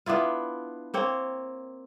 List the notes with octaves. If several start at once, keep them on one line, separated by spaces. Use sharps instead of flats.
B3 D4 E4 F4
A#3 C4 C#5